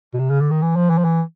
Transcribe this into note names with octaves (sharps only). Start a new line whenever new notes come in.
B2
C3
C#3
D3
D#3
E3
F3
E3
F3
E3